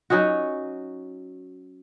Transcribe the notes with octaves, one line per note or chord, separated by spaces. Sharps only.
F#3 C#4 D#4 F#4